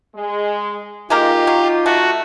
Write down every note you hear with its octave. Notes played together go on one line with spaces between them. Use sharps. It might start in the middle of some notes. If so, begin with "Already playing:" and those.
G#3
G#3 A#3 D#4 F4 G4 A#4
F#3
A3 F#4